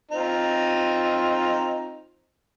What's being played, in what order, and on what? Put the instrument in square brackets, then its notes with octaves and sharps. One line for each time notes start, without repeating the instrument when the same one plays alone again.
[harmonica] C4 D#4 F4